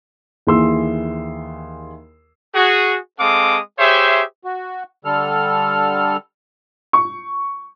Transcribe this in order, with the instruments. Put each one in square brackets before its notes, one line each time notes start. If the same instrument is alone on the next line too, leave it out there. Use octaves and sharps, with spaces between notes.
[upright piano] D#2 E3 G#4 C6 E6
[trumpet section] F#4 G#4
G#3 C4 A4 F5 D6 D#6
G4 G#4 C5 C#5 E5
[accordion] F#4
D3 G3 A4 F6
[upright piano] C#6